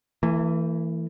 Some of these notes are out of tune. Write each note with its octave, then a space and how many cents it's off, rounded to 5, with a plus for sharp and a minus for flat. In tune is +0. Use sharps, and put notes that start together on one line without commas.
E3 +0 A3 +45